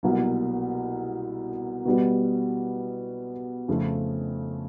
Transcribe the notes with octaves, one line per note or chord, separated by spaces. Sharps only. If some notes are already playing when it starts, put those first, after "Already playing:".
C2 B2 F#3 A#3
B2 G3 B3
F2 C#3 F3 A3